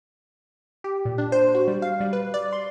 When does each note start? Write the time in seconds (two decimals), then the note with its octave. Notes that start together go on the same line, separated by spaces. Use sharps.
0.84 G4
1.05 A#2
1.18 D4
1.32 C5
1.55 F#4
1.68 G3
1.82 F5
2.00 G3
2.13 B4
2.34 D5
2.53 C6